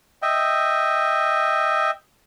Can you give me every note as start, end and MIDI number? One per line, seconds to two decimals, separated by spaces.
0.22 1.91 75
0.22 1.91 76
0.22 1.91 79